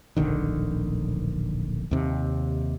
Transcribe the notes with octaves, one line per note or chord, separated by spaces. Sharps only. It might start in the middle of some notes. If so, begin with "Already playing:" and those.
D1 A#1 D3 D#3
D#2 C3